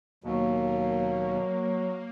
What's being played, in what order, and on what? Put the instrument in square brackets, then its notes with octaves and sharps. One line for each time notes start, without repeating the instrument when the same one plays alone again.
[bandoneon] D#2 B2 [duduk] F#3 [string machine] A#3